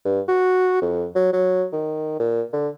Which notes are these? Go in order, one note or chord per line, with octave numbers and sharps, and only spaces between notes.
G2
F#4
F2
F#3
F#3
D#3
A#2
D3